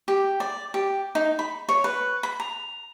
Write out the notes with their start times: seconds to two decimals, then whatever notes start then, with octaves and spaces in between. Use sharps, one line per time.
0.08 G4
0.40 D5
0.74 G4
1.15 D#4
1.39 B5
1.69 C#5
1.84 B4
2.23 B5
2.40 A#5